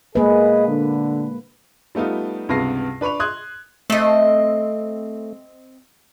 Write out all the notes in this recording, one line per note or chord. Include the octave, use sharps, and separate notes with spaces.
G#3 A#3 G#4 B4 D#5
D3
G3 A3 B3 D#4 F4
C#2 G2 C3 B3 A#6 C7
D4 B4 B5 C#6 F7
C6 D#6 F#6 G#6
A3 C4 D#5